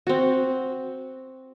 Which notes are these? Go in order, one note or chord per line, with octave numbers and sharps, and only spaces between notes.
C4 F#4